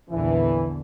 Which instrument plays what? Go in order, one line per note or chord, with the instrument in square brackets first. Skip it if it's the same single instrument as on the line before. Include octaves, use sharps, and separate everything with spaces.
[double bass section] A#1 E2 D3 [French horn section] E3